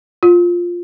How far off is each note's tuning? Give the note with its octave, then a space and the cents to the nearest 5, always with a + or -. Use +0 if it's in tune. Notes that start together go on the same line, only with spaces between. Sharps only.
F4 +5